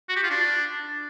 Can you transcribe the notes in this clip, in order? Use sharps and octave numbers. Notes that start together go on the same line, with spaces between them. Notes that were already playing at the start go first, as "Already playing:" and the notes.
F#4
G4
F4
D4